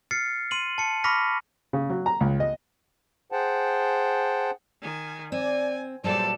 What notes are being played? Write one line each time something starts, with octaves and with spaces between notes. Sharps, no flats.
F6 A6 C7 C#7
C6 D#7 F#7
A5 C#7
B5 C#6 D6 F6 A#6 B6
C#3
F#3
A#5
C#2
D#5
G#4 C5 F#5 G5 A5
D#3 G#5
C4 D5 G#5
E2 A#2 F#3 G3 A4 C5 D5 A5